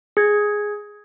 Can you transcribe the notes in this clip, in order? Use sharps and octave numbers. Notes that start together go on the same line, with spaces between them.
G#4 G#6